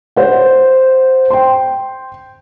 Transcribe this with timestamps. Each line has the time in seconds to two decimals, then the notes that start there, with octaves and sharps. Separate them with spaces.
0.16 C5 F#5
1.30 G5 C6